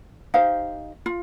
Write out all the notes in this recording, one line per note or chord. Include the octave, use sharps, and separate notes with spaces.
D#4 G4 C5 F5
F4